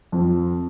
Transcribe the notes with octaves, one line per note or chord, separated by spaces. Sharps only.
F2